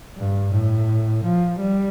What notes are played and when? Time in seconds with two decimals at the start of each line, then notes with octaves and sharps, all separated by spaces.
0.18 G2
0.53 A2
1.24 F3
1.60 G3